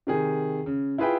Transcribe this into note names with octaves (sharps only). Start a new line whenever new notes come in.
C3 D#3 G#4
C#3
E4 F4 G#4 B4 E5 G5